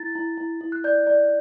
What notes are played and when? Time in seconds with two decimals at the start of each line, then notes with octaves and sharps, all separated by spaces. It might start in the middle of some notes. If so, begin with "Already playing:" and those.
Already playing: E4 A6
0.15 E4
0.37 E4
0.61 E4
0.72 F#6
0.84 D5 G6
1.07 D5